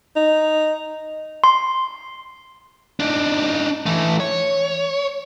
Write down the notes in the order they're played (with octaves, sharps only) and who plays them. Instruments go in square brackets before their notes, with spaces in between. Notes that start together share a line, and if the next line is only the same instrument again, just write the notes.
[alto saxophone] D#4
[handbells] C6
[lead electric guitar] D4 D#4
E3 A3
C#5